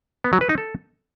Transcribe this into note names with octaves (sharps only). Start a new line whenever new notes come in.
B3
F#3
B4
D#4
A4